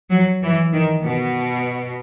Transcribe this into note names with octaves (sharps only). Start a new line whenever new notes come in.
F#3
E3
D#3
B2